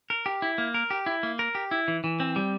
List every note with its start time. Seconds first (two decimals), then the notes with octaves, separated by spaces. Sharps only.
0.10 A#4
0.26 G4
0.42 E4
0.58 A#3
0.74 A#4
0.90 G4
1.06 E4
1.23 A#3
1.39 A#4
1.55 G4
1.71 E4
1.88 E3
2.04 E3
2.20 C4
2.36 G3